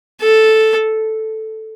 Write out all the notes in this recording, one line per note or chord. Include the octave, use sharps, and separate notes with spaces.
A4